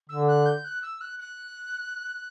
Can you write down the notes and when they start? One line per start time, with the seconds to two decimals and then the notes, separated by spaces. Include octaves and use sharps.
0.09 D3 E6
0.27 F#6
0.46 G6
0.64 F#6
0.82 E6
1.01 F#6
1.19 F#6